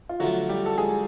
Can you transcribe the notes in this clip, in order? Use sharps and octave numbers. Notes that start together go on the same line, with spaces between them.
F4
D3 F3 F#3 A3 F#4
G3 G4
A4
G#3 G#4